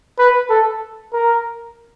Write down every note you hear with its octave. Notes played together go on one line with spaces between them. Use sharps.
B4
A4
A#4